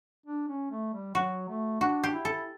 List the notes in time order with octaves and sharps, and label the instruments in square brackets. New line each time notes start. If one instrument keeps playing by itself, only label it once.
[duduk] D4
C#4
A3
G3
[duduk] F#3 [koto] F#4
[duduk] A3
[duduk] D4 [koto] F#4
[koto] G4
[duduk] E4
[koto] A4